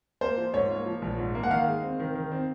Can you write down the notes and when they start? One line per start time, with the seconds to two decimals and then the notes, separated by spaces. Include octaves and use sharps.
0.21 A#3 C5
0.37 F3
0.54 G#2 C#5
0.70 A#3
0.86 F3
1.02 A#1
1.18 G#2
1.35 A#3
1.43 F#5
1.50 D#3 F5
1.67 G#3
1.83 C4
2.00 D#3
2.15 D#3
2.32 C4